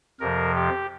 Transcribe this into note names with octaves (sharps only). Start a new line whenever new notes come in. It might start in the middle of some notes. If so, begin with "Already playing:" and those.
F2 C3 F3 A#4
G4